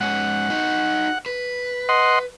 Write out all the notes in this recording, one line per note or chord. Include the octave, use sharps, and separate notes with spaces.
G#2 C#4 F#5
D#4 F#4
B4
D#5 F#5 C6